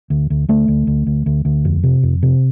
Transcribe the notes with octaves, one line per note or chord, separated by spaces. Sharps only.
D2
D2
D2 A3
D2
D2
D2
D2
D2
F2
C3
F2
C3